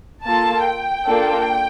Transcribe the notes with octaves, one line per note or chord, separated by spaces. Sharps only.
A#3 F4 A4 A5
G5
A#3 D4 F4 A4